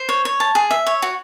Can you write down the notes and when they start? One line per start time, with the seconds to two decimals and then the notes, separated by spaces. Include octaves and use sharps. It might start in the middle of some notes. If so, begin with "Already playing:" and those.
Already playing: C5
0.09 C#5
0.25 C#5
0.40 A5
0.55 G#4
0.71 E5
0.87 C#5
1.02 F#4